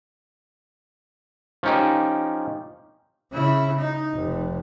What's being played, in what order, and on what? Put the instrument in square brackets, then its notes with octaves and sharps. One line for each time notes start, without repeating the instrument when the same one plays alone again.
[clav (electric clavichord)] F3 C#4 D#4 G4
[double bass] C#3 E4
D#4
F1